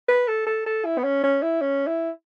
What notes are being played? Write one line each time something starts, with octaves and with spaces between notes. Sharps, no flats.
B4
A4
A4
A4
E4
B3
C#4
C#4
E4
C#4
E4